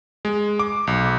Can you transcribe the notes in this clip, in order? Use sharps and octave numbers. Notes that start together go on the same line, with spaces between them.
G#3
D6
B1